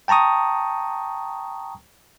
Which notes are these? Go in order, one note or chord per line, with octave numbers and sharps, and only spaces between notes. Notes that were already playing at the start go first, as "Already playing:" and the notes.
G5 A5 A#5 C#6 D#6